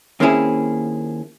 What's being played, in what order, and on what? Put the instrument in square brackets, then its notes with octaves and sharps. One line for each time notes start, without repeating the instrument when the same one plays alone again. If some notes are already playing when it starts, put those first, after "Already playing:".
[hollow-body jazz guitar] D#2 A#3 C4 C#4 E4 G#4